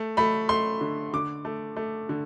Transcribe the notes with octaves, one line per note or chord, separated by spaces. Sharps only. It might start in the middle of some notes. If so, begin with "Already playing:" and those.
Already playing: A3
A3 B5
A3 C6
D3
D3 D6
A3
A3
D3